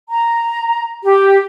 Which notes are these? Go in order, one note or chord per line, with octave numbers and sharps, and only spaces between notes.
A#5
G4